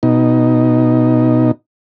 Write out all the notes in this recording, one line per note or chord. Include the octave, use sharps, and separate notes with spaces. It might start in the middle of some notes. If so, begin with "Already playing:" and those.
B2 D#4